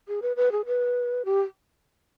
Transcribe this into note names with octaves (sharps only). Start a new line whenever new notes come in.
G#4
B4
B4
G#4
B4
G4